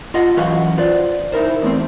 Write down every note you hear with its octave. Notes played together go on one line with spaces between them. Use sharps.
F4 D#5 F#5
F#2 E3 F#4 B4 F5 F#5
F4 B4 C5 D5
D#4 E4 A#4 C5
E2 A3 C4